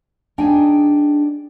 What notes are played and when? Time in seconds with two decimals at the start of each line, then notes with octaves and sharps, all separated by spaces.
0.38 D4 D#4 G#4 G5 G#5